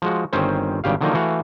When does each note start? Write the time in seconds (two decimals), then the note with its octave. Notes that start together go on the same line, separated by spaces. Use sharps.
0.02 F3 G#3 F#4
0.33 G1 D#3 C4 C#4 C5
0.84 G#1 G2 C#3 G4 F5
1.01 D3 D#3 F3 F#3 A#3 D#4
1.14 E3 A3 F#4 F5